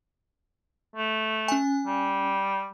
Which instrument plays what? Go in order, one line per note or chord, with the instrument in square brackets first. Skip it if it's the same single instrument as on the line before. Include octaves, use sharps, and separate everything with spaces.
[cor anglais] A3
[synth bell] C#4 G#5
[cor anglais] G3